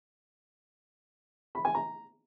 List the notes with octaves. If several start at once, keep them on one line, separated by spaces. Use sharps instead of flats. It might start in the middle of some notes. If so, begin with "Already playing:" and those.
B5
G#5
A#5